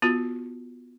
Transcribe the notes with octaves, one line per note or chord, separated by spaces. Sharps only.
B3 F4 F#4